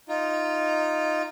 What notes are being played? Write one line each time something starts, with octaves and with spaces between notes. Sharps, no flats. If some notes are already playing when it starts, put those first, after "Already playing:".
D#4 F4